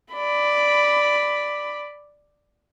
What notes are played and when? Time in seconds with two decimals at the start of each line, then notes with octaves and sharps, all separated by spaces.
0.14 D5 B5